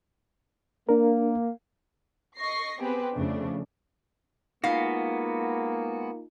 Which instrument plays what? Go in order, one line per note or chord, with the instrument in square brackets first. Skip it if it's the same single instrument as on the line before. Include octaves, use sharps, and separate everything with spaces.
[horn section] A#3 [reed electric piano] D4 A#4
[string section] D#5 C#6 A#6 C7
B3 C4 G4 G#4 B4
F2 C#3 A3 D4
[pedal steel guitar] G#3 B3 F#4 [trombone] A#3 [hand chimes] D#4 F4 [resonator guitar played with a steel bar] F5